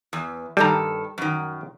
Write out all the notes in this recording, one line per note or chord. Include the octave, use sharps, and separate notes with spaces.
E2
G2 D#3 G3 A4 A#5
F#2 D#3